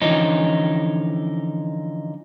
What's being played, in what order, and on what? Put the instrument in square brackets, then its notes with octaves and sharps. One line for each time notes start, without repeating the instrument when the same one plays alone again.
[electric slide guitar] D3 E3 F3 C#4 D#4